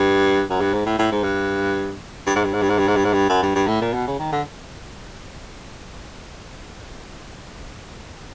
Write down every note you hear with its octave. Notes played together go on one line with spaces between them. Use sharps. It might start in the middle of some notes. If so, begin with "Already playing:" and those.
Already playing: G2
F#2
G2
G#2
A2
A2
G#2
G2
G2
G#2
G2
G#2
G2
G#2
G2
G#2
G2
G#2
G2
F#2
G2
G2
A2
A#2
B2
C#3
D#3
D3